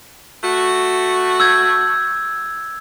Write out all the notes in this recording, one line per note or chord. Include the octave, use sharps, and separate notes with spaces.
A3 F#4
E6 G6 G#6